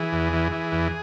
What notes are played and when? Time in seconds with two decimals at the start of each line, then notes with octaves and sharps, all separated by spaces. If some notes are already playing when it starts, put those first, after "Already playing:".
Already playing: E3 G#4
0.13 E2
0.33 E3
0.52 E3
0.72 E2